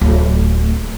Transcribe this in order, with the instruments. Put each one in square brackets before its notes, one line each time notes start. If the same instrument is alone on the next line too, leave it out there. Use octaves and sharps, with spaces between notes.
[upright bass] D1 A3